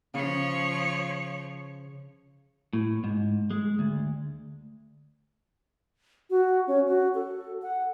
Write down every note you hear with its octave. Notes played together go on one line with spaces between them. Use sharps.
C#3 F3 C#5
A2
G#2
G#3
D2
F#4
C#4
F#4
A4
F#5